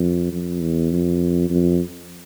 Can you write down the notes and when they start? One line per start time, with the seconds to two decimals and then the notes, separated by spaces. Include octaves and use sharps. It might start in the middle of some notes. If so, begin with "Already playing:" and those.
Already playing: F2
0.31 F2
0.60 E2
0.91 F2
1.49 F2